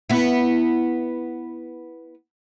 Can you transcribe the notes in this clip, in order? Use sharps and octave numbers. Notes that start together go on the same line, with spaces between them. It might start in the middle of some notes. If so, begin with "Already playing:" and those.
B3 E4